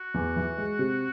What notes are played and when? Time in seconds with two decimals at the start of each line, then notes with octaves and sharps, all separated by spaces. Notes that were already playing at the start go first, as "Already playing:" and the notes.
Already playing: F#4
0.14 E2
0.36 E3
0.58 G#3
0.79 C3